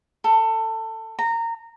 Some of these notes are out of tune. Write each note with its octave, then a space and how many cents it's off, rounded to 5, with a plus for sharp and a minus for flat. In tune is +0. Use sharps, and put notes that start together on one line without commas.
A4 +20
A#5 -20